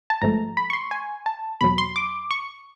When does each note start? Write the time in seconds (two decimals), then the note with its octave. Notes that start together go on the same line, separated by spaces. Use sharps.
0.10 A5
0.22 G#1 G#2 F3 A3 A#5
0.57 B5
0.70 C#6
0.73 C6
0.91 G#5
1.26 A5
1.61 E2 B2 F#3 B5
1.78 C6
1.96 D6
2.31 C#6